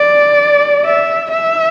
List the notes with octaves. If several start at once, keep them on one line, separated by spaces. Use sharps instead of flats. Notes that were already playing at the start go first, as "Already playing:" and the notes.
Already playing: D5
E5
E5